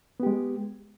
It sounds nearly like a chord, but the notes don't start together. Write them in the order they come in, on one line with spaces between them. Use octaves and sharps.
B3 G4 G#3